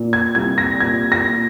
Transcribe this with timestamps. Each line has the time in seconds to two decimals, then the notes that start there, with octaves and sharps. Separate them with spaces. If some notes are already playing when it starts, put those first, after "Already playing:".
Already playing: A#2
0.13 G#6
0.35 C2 G#6
0.58 A#6
0.80 A#2 G#6
1.12 A#6
1.27 A#2